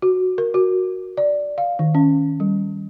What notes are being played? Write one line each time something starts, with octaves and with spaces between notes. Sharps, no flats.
F#4
A#4
F#4
D5
F5
D#3
C#4
G3